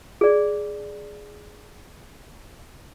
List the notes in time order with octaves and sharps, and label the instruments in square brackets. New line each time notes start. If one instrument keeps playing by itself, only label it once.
[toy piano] G#4 D5